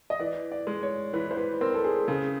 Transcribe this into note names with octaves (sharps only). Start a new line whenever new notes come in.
D#5
E3 D5
D5
G#3
C#5
E3 B4
C5
B4
C4 A#4
A4
G#4
C#3 G#4